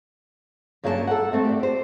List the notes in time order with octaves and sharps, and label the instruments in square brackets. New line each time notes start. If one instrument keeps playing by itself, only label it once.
[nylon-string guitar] G2 F#3 A#3 C#4 A4 A5
A4 F#5
A3 C4 E5
G4 D5
G4 C5